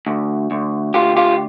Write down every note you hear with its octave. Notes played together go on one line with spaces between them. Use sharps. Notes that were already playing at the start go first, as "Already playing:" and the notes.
D2
D2
D2 F4 G4
F4 G4